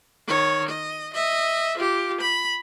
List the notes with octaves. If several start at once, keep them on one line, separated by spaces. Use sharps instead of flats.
D#3 C#5
D#5
D#5 E5
F4 G4
B5